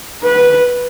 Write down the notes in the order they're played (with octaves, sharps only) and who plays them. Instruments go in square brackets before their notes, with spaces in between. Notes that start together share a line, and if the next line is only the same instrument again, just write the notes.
[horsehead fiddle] B4